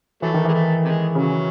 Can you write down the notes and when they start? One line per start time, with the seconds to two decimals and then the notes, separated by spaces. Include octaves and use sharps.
0.22 E3 F#3 A3
0.34 D#3
0.45 E3 G#3
0.53 A3
0.84 C3 G#3
1.15 C#3 F#3